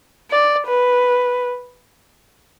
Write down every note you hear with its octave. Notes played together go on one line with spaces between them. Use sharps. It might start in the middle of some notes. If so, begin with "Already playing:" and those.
D5
B4